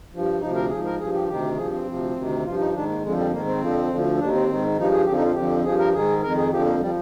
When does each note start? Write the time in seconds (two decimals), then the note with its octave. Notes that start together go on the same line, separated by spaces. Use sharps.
0.13 G2 F3
0.40 D2 C3 F3 D#4
0.55 A#4
0.70 G#2 F3 G#4
0.85 A#4
0.99 G2 F3 G#4
1.14 G4
1.28 D2 C3 D#3 G4
1.57 G2 F3 G#4
1.72 C4
1.86 D2 C3 F3
2.15 D2 C3 D#3
2.44 G2 F3 F4
2.59 D#4
2.73 G#2 D#3 D4
2.88 A#3
3.02 F2 D3 F3 G#3
3.17 G3
3.31 G#2 D#3 A#3
3.46 C4
3.61 F2 D3 F3
3.90 D2 D3 F3
4.19 D#2 D#3 D4
4.33 C4
4.48 G#2 D#3
4.76 G2 F3 D#4
4.91 G#4
5.06 F2 D3 F3 G4
5.16 D#4
5.25 F4
5.35 F2 D3 F3 G4
5.64 G2 F3 G#4
5.79 A#4
5.93 G#2 D#3 G#4
6.22 F2 D#3 A#4
6.37 G#4
6.51 F2 D3 F3 G4
6.65 A#3
6.80 F3 G3